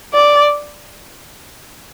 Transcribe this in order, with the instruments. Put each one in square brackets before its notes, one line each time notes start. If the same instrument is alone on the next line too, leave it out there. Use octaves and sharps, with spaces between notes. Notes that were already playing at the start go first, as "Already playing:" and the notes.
[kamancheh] D5